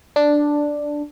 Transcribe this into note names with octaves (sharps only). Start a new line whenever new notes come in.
D4